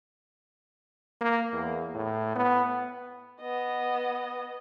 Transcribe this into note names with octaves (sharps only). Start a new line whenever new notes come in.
A#3
E2
A2
B3
B3 D#5